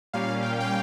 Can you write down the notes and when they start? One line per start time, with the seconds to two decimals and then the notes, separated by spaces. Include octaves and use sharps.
0.13 A#2 G3 A#3 C#4 F5
0.42 G5
0.60 G5